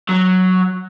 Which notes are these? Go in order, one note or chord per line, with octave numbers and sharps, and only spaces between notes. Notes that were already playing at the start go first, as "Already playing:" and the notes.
F#3